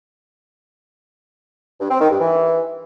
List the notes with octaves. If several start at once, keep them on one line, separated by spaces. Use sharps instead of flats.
G2
C4
D#3
G2
E3